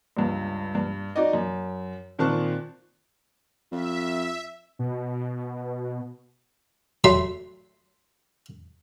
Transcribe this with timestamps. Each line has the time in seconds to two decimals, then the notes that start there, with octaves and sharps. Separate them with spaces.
0.17 C#2 G2
0.75 G2
1.16 D#4 F#4 D5 D#5
1.33 F#2
2.19 A#2 D#3 C4 A5 C#6 F#6
3.72 F2 E5
4.79 B2
7.04 F#3 A3 E5 B5 C6